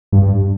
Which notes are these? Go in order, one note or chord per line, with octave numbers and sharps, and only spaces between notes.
G2
G2